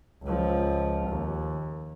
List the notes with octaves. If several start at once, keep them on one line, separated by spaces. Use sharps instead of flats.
C#2 F3
D#2